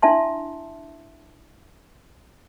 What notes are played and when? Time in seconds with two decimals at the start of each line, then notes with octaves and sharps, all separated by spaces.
0.02 D4 E4 E5 A5 C6